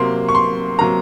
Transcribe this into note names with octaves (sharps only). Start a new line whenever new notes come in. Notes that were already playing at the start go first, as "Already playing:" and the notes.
Already playing: C3 F#3 A#3 C6
C#6
C6
C3 F#3 A#3 A#5